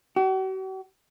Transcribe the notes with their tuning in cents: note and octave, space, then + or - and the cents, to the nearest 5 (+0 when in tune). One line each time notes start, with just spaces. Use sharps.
F#4 +45